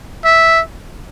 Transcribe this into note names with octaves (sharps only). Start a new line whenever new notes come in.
E5